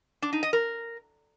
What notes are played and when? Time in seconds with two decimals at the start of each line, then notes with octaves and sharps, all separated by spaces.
0.22 D4
0.33 D#4
0.43 D#5
0.53 A#4